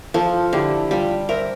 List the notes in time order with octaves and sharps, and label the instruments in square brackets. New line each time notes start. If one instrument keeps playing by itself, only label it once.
[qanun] F3 [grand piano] F4 A4
[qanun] D3 [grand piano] E4 G4
[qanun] G3 [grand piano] F4
[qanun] A#4 [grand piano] C5 E5